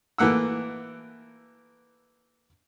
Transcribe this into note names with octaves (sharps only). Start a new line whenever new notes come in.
E3 A3 A#3 F#5 E6